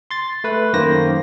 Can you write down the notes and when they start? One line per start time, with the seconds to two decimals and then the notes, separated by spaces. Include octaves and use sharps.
0.11 C6 A6
0.44 A3 B4
0.73 F#2 D#3 A#3 C5 A#6